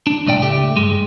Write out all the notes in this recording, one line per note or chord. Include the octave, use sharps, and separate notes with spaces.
D4
C2 A2 D5 G5
C#2 A3 G4
G2 G#3